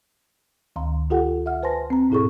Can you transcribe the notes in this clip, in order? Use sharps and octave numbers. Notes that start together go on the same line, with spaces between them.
D2 D#3 F5 A#5 C6
F4 G4 A4 F#5 G5
E5 F#5 F6
B4 C5 G#5 A5 C6 A#6
C4 A#5
G#2 B2 E4 G#4 A4 C#6